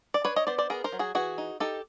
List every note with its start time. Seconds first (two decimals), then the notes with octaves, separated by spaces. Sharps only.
0.14 D5
0.25 D4 B4 C#5
0.36 C#5 D#5
0.47 B3 C5 D5
0.58 C5 D5
0.70 B3 G#4 A#4
0.84 A#4 C5
0.92 F#3
0.99 F#4 G#4
1.15 E3 F#4 G#4
1.38 D#4
1.60 D#4 G4 A4